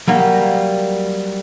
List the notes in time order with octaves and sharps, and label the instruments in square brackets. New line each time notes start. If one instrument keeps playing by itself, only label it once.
[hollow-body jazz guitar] F#3 G3 A#3